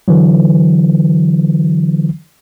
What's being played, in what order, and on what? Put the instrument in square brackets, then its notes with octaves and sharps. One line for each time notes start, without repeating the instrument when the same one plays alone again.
[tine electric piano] D3 E3 F#3